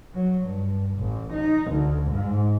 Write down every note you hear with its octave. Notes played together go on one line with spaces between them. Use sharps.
F#3
G2
A1
D#4
D2
G#2